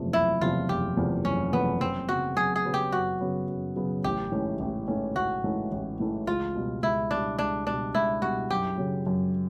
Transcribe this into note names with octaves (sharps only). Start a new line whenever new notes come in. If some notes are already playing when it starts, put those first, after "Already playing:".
Already playing: F#1 E2 C3 F3 A3
F#1 E4
E2 C3 F3 A3 F4
F#1 G4
E2 C3 F3 A3
F#1 C#4
E2 C3 F3 A3 B3
F#2 C4
C#3 F#3 B3 F#4
F#2 G#4
G#4
C#3 F#3 B3
G4
F#2 F#4
C#3 F#3 B3
F#2
C#3 F#3 B3
A1 G4
G#2 E3 A3 C#4
A1
G#2 E3 A3 C#4
A1 F#4
G#2 E3 A3 C#4
A1
G#2 E3 A3 C#4
C#2 F4
B2 G3
C#2 E4
B2 G3 D4
C#2 D4
B2 G3 D4
C#2 E4
B2 G3 F#4
F#2 G4
C#3 F#3
F#2